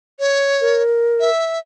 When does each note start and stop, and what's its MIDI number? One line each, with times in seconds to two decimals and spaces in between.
0.20 0.82 73
0.61 1.30 70
1.20 1.59 76